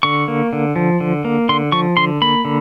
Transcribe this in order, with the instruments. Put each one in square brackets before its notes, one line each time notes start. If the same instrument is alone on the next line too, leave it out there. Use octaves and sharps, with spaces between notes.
[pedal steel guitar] D3 C#6
A#3
D3
F3
D3
A#3
D3 C6
F3 C#6
D3 C6
A#3 B5
D3